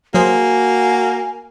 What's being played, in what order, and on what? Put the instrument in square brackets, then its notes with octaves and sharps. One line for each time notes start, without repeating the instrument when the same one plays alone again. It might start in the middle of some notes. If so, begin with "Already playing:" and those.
[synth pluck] F#3 G#4 C5 [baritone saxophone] A#3 [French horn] F#4 [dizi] G#5